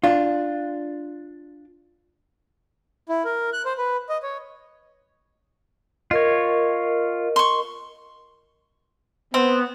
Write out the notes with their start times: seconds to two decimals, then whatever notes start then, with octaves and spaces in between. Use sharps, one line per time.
0.04 D4 F4
3.09 E4
3.25 A#4
3.53 F#6
3.65 C5
3.78 B4
4.09 D#5
4.23 C#5
6.11 F4 A#4 C#5 D#5
7.36 C6 C#6
9.34 B3 C4